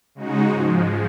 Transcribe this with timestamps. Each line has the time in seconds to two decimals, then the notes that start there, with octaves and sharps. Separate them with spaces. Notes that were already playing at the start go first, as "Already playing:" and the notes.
0.15 C#3 G#3 D#4 F#4
0.49 G#2 F3 G#3